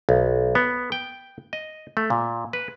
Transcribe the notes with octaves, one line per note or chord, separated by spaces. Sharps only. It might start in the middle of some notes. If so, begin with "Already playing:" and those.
B1
B3
G5
D#5
A3
A#2
B4